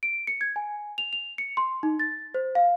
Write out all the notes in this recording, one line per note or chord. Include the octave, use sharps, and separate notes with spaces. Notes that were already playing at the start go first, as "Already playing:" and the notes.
D7
C#7
G#6
G#5
F7
F7
C#7
C6
D#4
A6
C5
F5